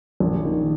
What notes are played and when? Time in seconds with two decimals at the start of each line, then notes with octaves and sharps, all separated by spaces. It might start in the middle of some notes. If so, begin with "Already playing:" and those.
0.20 A#1
0.45 D#3